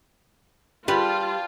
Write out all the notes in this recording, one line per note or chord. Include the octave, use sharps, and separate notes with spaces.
G3 F4 B4 G5 A5